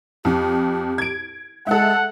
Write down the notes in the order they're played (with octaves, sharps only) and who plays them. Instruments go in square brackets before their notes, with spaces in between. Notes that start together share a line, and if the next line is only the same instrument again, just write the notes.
[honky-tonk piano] F2 [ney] G4
[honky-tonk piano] G#6 D7
[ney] G#3 [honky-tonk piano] A4 E5 [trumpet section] F#5